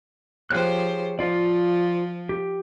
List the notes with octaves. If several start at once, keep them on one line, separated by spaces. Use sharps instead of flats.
F3 G4 G#4 C5 C#5 F#6
F3 F4 D5
G4